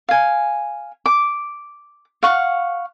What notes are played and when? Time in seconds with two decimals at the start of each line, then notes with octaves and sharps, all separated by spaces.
0.09 F5 G#5
1.06 D6
2.23 F5 F#5 C#6